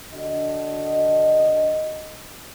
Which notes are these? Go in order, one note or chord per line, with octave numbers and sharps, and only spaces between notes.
D3 D4 F#4 D#5